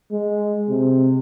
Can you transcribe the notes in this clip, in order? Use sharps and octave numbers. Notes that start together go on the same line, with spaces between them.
G#3
C3